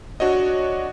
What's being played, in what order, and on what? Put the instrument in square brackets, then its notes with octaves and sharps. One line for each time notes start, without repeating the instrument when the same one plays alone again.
[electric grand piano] D4 F#4 C#5 D#5